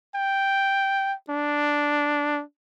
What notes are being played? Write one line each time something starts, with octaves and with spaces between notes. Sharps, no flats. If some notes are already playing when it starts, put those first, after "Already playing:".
G5
D4